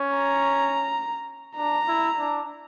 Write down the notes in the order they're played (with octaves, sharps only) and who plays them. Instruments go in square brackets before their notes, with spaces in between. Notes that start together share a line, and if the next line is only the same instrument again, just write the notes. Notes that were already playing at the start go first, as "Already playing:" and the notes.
Already playing: [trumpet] C#4
[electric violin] A#5
[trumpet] D4 [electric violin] A#5
[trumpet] E4
D4